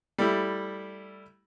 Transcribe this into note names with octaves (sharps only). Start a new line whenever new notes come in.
G3 A3 E4